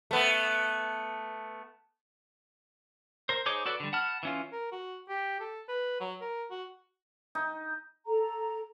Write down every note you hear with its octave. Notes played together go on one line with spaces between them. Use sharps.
A3 B3
A#4 C5
D#4 G#4 C5 C#5 D6
F#4 A4 B4 D5
D3 G3
F#5 A5 B5 F6
E3 C#4 F4
A#4
F#4
G4
A4
B4
F#3
A#4
F#4
D#4
A4 A#5